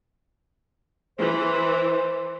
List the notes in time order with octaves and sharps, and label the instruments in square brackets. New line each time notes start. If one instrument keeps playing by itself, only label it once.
[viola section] E3 [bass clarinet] C5